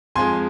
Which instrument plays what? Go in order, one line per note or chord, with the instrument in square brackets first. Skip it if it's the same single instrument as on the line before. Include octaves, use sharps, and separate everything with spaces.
[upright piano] F2 F3 G#3 G#5 C6